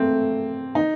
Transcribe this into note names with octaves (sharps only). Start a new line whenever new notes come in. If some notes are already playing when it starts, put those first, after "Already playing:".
Already playing: A3 A#3 C4
D#4